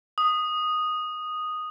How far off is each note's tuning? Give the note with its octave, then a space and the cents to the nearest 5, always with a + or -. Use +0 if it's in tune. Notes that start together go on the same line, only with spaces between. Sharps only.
D#6 -5